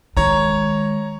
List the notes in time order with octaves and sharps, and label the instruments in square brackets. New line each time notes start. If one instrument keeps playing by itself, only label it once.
[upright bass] D#3 G#3 [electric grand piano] C#5 A#5